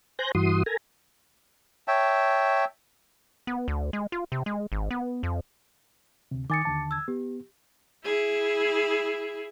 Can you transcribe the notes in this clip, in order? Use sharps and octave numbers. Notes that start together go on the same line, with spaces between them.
C5 G#5 F#6 G6 A#6
G2 E3 F#4 C6 D#6
A4 A#4 G#5 A#5
C#5 E5 G5 A5
B3
D2
G#3
F4
C3
G#3
G#1
B3
F2
D2 C3
D#3 G#5 D6 D#6 A6 C#7
D#2 D3 A5
E6 G#6
B3 G4
E4 G#4